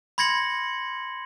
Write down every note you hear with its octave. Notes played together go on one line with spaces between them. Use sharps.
B5 C6 G#6 A#6 C#7 F#7